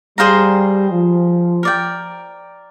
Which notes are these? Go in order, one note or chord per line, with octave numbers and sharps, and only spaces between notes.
G3 G#4 C5 F5 A#5
F3
A#4 D5 G5